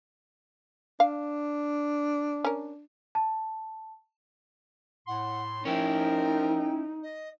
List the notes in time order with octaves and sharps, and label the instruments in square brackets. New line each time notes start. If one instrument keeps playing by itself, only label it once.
[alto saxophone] D4 [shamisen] F5
[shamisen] C#4 A#4
[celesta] A5
[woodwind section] A2 C6 [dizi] F#5
[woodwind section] F3 A#4 [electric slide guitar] C#4 E4 [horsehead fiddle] D#4 [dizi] G5
[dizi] D#5